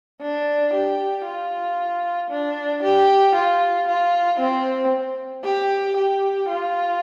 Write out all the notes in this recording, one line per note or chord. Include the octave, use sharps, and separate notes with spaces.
D4
G4
F4
D4
G4
F4
F4
C4
G4
G4
F4